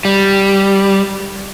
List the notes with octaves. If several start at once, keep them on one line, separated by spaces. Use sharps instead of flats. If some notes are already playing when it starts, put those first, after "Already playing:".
G3